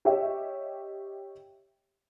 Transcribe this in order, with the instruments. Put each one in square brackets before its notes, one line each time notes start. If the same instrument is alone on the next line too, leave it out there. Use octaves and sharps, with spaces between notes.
[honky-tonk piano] G4 C#5 D#5 E5 G5